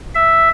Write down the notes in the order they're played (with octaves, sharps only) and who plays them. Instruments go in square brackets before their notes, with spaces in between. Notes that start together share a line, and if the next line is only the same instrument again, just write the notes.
[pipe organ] E5